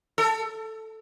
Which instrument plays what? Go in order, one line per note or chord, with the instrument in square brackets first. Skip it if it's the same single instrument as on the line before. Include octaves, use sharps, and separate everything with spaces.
[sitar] A4